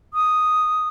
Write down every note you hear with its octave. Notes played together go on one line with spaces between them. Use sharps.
D#6